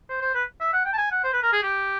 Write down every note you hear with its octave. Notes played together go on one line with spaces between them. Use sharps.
C5
C5
B4
E5
F#5
G5
A5
G#5
F#5
C5
B4
A#4
G#4
G4